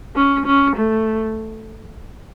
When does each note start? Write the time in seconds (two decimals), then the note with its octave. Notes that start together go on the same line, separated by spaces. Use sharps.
0.16 C#4
0.46 C#4
0.76 A3